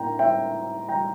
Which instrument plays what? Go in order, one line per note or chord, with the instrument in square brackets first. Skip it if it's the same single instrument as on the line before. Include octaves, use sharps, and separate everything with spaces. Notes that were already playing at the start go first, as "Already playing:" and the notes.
Already playing: [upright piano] A2 A#3 D4 G5 A#5
E5 G5
G5 A#5